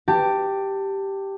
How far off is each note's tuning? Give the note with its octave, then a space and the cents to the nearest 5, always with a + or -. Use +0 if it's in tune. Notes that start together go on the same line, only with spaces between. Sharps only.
G4 +0 A5 +20